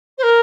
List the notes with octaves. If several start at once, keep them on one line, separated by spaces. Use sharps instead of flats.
C5
A#4